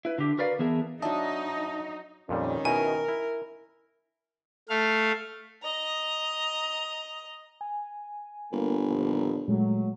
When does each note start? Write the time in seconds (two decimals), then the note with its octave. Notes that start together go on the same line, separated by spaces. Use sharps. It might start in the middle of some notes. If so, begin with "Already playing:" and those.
0.05 E4 B4
0.18 D3 G4
0.38 F#4 A#4 B4 D5 F5
0.59 E3 B3 G#4 A#4 E5 A5
1.02 F#3 D4 D#4 E5 A5 D#6
2.29 F2 A#2 D#3 G3 C#4
2.65 B2 D#4 E4 A#4 G#5
3.08 E4
4.69 A3 F5
5.63 D#5 A#5
7.61 G#5
8.52 G1 A#3
8.86 D#2 A#2 F3
9.48 A#2 F#3 G#3 A3